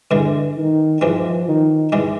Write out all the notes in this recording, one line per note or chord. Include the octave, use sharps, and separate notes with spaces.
G2 D3 E3 G#3
D#3
G2 E3 F3 G#3
D#3
G2 E3 G#3